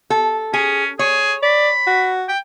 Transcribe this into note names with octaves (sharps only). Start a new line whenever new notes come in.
A4
C#4 G#4
G#4 C#5
D5 B5
F#4
G5